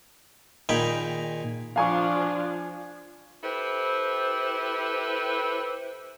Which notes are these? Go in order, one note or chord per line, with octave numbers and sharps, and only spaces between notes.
A#2 D#3 D#4 G#4 G5 B5
F3 D4 F4 F5 G#5 C#6
E4 G4 A4 B4 C5